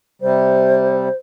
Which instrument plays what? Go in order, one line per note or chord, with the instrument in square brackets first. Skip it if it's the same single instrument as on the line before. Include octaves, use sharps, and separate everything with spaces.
[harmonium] C3 G3 [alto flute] C5